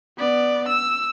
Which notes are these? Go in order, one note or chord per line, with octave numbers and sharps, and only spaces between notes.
B3 D5
E6